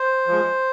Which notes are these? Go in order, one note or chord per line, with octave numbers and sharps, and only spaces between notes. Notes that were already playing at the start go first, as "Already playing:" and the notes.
Already playing: C5
F3 G#3